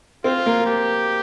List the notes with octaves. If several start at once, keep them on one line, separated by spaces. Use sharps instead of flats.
C4 F4
A#3
G4